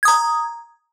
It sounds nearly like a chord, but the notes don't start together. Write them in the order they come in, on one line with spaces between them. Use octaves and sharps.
G#6 D#6 A#5